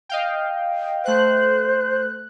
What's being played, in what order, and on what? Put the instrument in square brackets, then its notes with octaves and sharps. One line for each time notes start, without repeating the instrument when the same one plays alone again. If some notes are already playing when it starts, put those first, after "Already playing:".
[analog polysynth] D#5 F5 G5
[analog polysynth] A3 F#6 [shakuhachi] C5